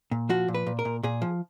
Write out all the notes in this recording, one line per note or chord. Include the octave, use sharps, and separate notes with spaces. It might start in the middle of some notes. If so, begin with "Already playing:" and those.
A#2
F3 F#4
A#2
B4
A#2
A#4
A#2
A#2 G#4
F3